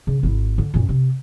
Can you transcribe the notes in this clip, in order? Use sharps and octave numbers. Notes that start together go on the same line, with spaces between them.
C#3
G#1 E4
D3
F#2 A#2
C3